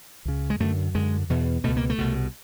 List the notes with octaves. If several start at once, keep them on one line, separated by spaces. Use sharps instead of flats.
C#2 C#3
G#3
F#2 D3 A3
F#2 D3 G#3
E2 B2
C#2 B2 A3
A#3
A3
C2 B2